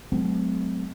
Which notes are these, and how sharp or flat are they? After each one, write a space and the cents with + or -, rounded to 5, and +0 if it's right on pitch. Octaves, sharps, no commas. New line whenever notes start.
F#3 +0 A3 -45 C4 -35